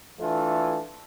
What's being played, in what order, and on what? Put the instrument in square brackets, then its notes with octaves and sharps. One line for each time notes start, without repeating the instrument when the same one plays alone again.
[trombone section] E3 A3 D4 F4 A4